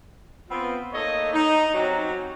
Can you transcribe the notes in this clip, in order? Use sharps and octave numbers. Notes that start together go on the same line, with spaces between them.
B3 C4 F4
A3 A#3 D#4 A4 C#5 D#5
D#4
F#3 C4 C#4 D#4 F#4 G4